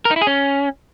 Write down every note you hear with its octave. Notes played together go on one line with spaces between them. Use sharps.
A#4
D#4
E4
G#4
C#4